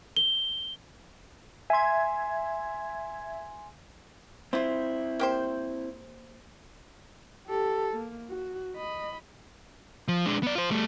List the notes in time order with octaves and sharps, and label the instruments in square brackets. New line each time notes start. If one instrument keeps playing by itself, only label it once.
[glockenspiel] G7
[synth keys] E5 G#6 [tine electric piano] G#5 C6
[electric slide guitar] C4 E4 [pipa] F4 C5
[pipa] A#3 G4 C5
[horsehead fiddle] G4 A4
A#3
F#4
D#5 B5
[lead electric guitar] F3
G#3 D4
B3 D5
F4 C5
G3 A3